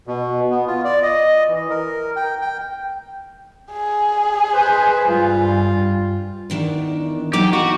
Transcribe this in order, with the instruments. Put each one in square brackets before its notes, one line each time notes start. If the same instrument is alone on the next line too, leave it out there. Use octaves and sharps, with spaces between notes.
[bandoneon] B2
B3
F4
D5
D#5
E3
A#4
G5
G5
[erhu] G#4
[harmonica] B4 C5
[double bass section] G2 G3 [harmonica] F4
[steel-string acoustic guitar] E2 D#3 D4
[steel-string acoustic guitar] E2 F#3 D#4 [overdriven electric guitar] G4
[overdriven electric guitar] F#4 [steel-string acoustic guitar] A#5